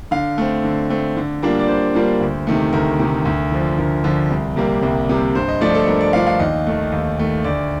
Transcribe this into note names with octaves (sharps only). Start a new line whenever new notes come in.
D3 F5
A3 C4
D3
A3 C4
D3
G3 A#3 D4 F4
D5
D3 C5
G3 A#3 D4 F4
D2
C3 D#3 A3
D2 A#4
C3 D#3 A3
D2
D3 F3
D2 A#4
D3 F3
C2
C3 G3 A#3
C2
C3 G3 A#3
G2 C5
D#5
F3 A3 D4 F4 D5
A4
G2 A#4
D5
F3 A3 D4 F4 F5
F5
D#2 D#5
D#3 A3
D#2
D#3 A3
D2 D5